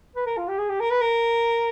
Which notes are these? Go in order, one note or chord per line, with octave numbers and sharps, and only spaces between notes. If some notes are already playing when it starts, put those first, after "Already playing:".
B4
A#4
F4
G4
G#4
G4
A#4
B4
A#4